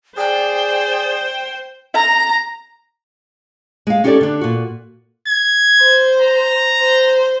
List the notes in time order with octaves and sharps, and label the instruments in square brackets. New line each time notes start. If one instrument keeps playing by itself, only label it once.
[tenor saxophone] G#4 [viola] C5 [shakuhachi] D5 [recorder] G5
[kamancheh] A#5
[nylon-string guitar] G#3 F5
C#4 D#4 G4 A4 C#5 D5
D3 D4
A#2 F#4
[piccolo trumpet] G#6
[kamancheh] C5
[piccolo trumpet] A#5
[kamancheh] C5